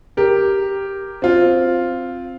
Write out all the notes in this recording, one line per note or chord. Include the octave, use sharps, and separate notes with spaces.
G4 A#4
C4 F4